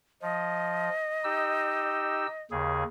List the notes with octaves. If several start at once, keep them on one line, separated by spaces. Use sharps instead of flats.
F3 D#5
D#4 G4 E6
D#2 C#3 G#4